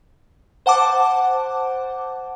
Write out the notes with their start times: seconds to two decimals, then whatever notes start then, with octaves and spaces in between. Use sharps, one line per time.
0.66 C5 F#5 A5 D6